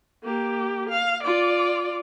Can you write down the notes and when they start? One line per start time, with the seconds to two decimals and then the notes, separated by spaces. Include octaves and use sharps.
0.23 A#3 G4
0.90 F5
1.24 F4 D5